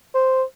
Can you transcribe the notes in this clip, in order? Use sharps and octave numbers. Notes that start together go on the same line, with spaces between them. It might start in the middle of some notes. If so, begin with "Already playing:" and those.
C5